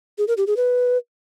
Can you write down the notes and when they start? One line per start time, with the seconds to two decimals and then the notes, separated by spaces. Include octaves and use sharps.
0.18 G#4
0.28 A#4
0.37 G4
0.47 G#4
0.57 B4